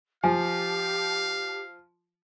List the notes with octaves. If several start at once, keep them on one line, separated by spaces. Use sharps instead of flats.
F3 G4 F5 G#5 A5